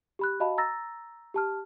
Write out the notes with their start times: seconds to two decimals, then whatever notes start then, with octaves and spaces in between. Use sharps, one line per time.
0.19 G4 B5 F#6
0.40 F#4 D#5 F5 A5 B5
0.58 A#5 E6 A6 A#6
1.34 G4 A5 F6